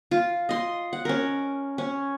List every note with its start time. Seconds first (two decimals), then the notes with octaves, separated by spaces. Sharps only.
0.11 F4
0.49 D#5 C6
0.93 F#5
1.05 C#4 A#4
1.78 C#4